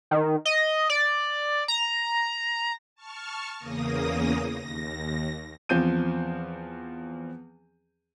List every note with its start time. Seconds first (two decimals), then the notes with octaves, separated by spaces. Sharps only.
0.11 D#3
0.45 D#5
0.90 D5
1.68 A#5
2.95 A5 C#6 F6
3.58 E2 C#3 A#3 D#6 A#6
4.50 D#2 A#6
5.69 E2 F3 C4 G6 D#7